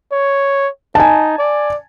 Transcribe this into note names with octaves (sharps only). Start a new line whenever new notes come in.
C#5
D#4 G#5 A5
D5